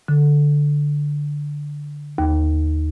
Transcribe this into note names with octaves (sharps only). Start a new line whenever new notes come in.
D3
D#2